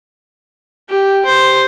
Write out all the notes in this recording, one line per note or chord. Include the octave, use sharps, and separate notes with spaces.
G4
C5